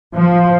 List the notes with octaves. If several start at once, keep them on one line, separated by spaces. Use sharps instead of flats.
F3